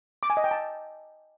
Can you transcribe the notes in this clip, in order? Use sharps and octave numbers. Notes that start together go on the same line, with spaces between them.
D6
G#5
D#5
G5
A5